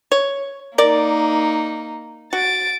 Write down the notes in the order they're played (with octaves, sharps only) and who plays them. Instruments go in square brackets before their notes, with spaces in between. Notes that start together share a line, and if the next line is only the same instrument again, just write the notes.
[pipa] C#5
[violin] A#3 D#4 [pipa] A#4 D5
[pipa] F#4 [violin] A6 D7